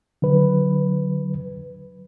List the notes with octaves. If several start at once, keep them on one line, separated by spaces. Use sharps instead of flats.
D3 F#3 B4